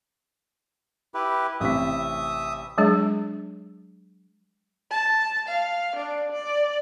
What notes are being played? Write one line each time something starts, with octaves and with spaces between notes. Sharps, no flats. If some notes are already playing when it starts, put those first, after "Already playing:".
E4 G4 B4
A1 C3 E5 D#6 B6
F#3 G#3 D4 G#4
A5
F5
D4
D5